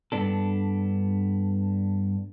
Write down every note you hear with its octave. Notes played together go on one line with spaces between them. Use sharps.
G2 B3 D4 A4